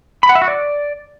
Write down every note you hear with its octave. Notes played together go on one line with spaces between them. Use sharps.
B5
F#5
E5
F#4
D5